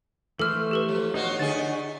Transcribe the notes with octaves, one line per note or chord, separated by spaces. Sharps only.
E3 A3 A4 C5 F6
G4 A4 B4
F3
B2 D#4 F4 F#4 C#5
D3 E4 G#4 A6